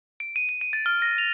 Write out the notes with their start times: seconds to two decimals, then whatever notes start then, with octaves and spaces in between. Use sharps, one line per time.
0.20 D7
0.36 D#7
0.49 D#7
0.61 D#7
0.73 A6
0.86 F6
1.02 A#6
1.18 F7